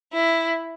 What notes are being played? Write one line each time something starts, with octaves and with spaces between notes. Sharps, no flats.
E4